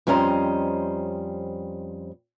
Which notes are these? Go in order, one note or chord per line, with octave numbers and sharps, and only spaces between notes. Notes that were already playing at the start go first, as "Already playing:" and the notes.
F2 G3 C#4 C5 D#5 A#5